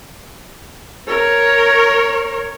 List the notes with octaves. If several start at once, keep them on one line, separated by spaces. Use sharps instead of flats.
A#4 C#5